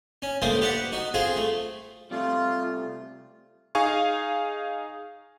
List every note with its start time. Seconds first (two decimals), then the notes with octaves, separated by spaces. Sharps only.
0.22 C#4
0.42 C#2 A3 A#3 C5 D#6
0.61 G4 B4 D5 F#5
0.92 D#4 F#4
1.14 C4 F4 G#4
1.36 A3
2.11 C3 G3 A3 F4
3.75 D#4 G#4 F5 G#5 C#6